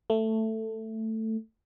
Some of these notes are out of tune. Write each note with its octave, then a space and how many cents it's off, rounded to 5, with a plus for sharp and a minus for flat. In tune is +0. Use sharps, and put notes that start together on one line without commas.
A3 +10